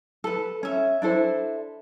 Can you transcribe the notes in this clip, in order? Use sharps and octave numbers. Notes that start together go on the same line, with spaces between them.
A4 B4
C#4 E5
D4 E4 A4 C5